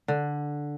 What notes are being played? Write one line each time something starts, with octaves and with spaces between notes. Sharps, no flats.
D3